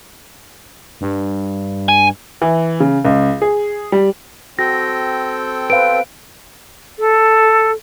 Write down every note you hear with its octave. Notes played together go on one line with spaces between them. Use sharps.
G2
G#5
E3
C#3
C#2
G#4
G3
C4 F#4 A4 G5 A#6
B4 C5 F5 D7
A4